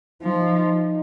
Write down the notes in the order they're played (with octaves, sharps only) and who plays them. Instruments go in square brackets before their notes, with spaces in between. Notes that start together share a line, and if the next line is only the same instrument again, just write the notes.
[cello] F3 [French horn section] D#4